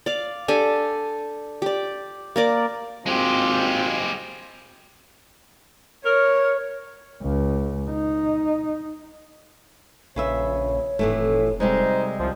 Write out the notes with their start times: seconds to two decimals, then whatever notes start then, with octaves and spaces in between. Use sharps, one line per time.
0.06 D5 F5
0.48 D4 G4 A4 G#5
1.62 G4 D5
2.36 A#3 A#4 D5
3.06 G#1 G#3 C4 F4 G4
6.05 A#4 C#5
7.22 C#2
7.90 D#4
10.16 A#1 C#3 B4 C#5 E5
10.99 F1 A2 E3 A3
11.60 C3 G3 G#3 D#4 C5
12.19 C2 F3